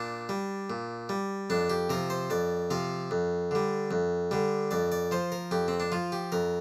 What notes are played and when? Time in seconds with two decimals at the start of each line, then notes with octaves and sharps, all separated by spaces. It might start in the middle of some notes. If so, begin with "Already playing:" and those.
Already playing: A#2 D4
0.29 G3
0.70 A#2
1.09 G3
1.50 F2 D4
1.70 G4
1.90 C3 F3 A#4
2.10 C5
2.30 F2 D5
2.70 C3 F3 F5
3.11 F2
3.51 D3 G3
3.91 F2
4.31 D3 G3
4.71 F2 D5
4.92 D5
5.11 F3 C5
5.32 A#4
5.51 F2 G4
5.68 C4
5.80 D4
5.92 F3 F4
6.12 G4
6.32 F2 A#4